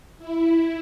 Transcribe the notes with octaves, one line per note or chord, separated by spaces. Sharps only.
E4